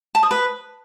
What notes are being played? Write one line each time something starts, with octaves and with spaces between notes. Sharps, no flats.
A5
D#6
B4